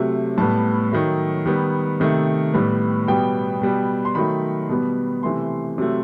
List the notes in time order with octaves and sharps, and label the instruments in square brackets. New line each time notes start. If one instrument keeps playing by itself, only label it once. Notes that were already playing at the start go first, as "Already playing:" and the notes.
Already playing: [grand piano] C3 F#3 A3
A2 G3 B3 A5
D#3 F#3 A3
D#3 G3 B3
C3 D#3 A3
A2 G3 B3
B2 G3 B3 G5
B2 G3 B3
C6
D#3 F#3 A3 B5
B2 G3 B3
C3 E3 A3 C6
C3 F#3 A3